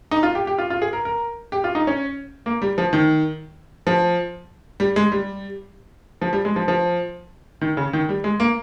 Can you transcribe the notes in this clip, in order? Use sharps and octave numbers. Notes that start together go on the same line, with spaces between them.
D#4
F4
G4
G4
F4
F4
G#4
A#4
A#4
G4
F4
D#4
C#4
A#3
G3
F3
D#3
F3
G3
G#3
G3
F3
G3
G#3
F3
F3
D#3
C#3
D#3
G3
G#3
A#3